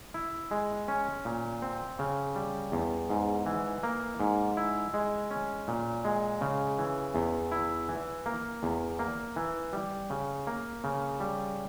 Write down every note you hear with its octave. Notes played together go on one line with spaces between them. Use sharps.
E4
G#3
C#4
A#2
C4
C#3
G3
E2
G#2
E3
A#3
G#2
E4
G#3
C#4
A#2
G#3
C#3
E3
E2
E4
E3
A#3
E2
A#3
E3
G3
C#3
A#3
C#3
G3